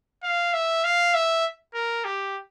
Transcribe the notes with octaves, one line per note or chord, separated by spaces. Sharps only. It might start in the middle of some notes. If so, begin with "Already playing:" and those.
F5
E5
F5
E5
A#4
G4